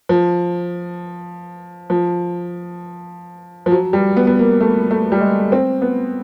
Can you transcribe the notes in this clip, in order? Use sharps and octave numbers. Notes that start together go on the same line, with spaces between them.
F3
F3
F3
F#3
G3
B3
B3
A#3
A3
A3
G3
G#3
C4
B3